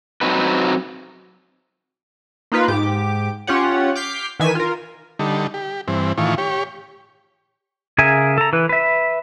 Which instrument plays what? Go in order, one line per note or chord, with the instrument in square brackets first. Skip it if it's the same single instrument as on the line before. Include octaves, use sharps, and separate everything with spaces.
[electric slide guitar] F#3 C4 D#4 B4
[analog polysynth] A#3 D#4 F4 B4
G#2 G4 D6
C#4 F4 G4 C#5 F#5
D6 F6 G6 B6 C7
D#3 E3 G#5 B6 E7
F4 A#4
[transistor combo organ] D3 G3 D#4 A4
G4
G2 E3 C4
A2 D#3 E3 F4 C#6
G4 C#5
[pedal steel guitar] C#3 G#4 A#4 E5 G#5
A4 A#5
E3 B4
B4 E5